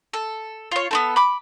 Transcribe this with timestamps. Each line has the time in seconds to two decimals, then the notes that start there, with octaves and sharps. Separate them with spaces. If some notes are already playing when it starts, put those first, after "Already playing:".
0.13 A4
0.72 F4 C#5
0.91 B3 C4 A4
1.16 B5 D6